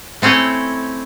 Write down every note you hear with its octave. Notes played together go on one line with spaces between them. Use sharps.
A3 C4 C#4 E4 D#5